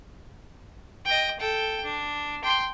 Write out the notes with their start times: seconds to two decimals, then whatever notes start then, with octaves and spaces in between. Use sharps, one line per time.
1.05 D#5 G5
1.40 A4 G5
1.84 D4
2.43 G5 C6